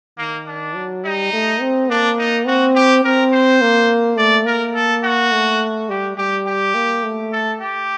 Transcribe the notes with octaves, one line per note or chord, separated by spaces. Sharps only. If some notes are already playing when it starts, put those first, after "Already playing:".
D#3 A#3
D4
F#3
G3 D#4
A3
C4
A#3 D4
D#4
C4 F#4
G4
C4 A#4
C5
A#3
A3 D5
A#3 A#4
A4
F#4
A3
G3 G4
G3 G4
G4
A#3
A3
A4
G4